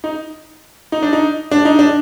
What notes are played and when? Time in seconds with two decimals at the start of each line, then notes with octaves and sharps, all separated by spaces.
0.04 D#4
0.92 D#4
1.02 D4
1.13 D#4
1.51 D4
1.65 D#4
1.79 D4